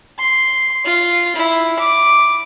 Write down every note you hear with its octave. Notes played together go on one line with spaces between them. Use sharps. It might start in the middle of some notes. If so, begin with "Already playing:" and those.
C6
F4
E4
D6